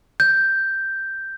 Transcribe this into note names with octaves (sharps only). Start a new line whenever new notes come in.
G6